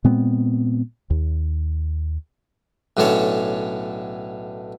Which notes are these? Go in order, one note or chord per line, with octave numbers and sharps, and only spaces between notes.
A#2 G#3 B3 C4
D#2
B1 A2 D3 C#4 A4 C#5